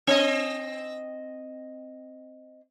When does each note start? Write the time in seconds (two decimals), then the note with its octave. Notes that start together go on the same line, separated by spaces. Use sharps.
0.07 C4 D#5